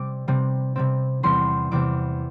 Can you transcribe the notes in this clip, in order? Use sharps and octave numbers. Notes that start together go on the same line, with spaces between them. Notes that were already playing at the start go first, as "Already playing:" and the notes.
Already playing: C3 G3 C4 D6 E6
C3 G3 C4
C3 G3 C4
E2 C3 G3 C4 C6
E2 C3 G3 C4 D6